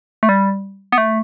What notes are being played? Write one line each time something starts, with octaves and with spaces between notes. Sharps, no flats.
A3
G3
B3
A3